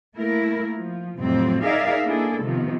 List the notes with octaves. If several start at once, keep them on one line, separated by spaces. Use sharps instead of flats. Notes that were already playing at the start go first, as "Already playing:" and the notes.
A3 A#3 E4 A#4
F3
F2 A2 C3 F#3 A3 C4
D#4 G#4 A#4 D5 E5 F5
A#3 D4 E4 G#4 A4
C3 D#3 F3 B3